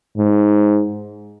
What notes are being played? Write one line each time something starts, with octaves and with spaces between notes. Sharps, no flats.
G#2